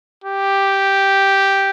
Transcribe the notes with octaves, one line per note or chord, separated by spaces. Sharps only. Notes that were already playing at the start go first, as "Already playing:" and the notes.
G4